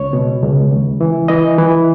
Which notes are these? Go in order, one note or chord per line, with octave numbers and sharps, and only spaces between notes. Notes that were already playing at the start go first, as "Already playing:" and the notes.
Already playing: C#2 C#5
B2
C#2
D#2
E3
E3 D#5
E3